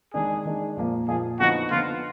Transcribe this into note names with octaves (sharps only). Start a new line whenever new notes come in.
D#3 G#3 D4 G#4
D#3 G#3 D4
A#2 F3 A#3 F4
A#2 F3 A#3 F4 G#4
D3 F3 B3 D#4 F#4
D3 F3 B3 D#4 F4